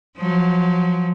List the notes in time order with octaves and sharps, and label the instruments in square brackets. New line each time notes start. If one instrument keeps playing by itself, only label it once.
[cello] F3 F#3